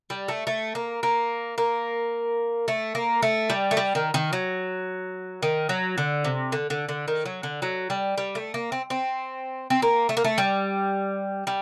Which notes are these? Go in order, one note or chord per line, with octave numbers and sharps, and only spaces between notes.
G3
A3
A3
A#3
A#3
A#3
A3
A#3
A3
G3
A3
G3
D#3
D#3
F#3
D#3
F#3
D3
C3
D3
D3
D3
D#3
F#3
D3
F#3
G3
G3
A3
A#3
C4
C4
C4
A#3
A3
A#3
A3
G3
G3